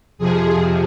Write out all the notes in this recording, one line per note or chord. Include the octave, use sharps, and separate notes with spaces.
F2 C3 F3 G#4